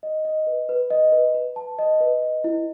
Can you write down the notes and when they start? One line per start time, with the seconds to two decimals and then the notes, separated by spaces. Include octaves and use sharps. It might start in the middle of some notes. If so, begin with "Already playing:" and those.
0.03 D#5
0.25 D#5
0.47 B4
0.69 B4
0.90 D#5
1.12 B4
1.35 B4
1.56 A5
1.78 D#5
2.01 B4
2.22 D#5
2.44 E4